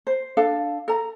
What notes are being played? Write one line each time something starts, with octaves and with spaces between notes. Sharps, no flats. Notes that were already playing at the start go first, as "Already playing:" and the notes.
C5
D4 A4 F5
A4 A#5